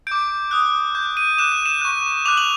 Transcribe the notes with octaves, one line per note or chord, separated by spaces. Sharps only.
D6 G6 D7
D#6 F#6
D6 G6
D#7
D6 F#6 E7
D#7
E7
C#6 F#6
D6 F#6 F7
F#7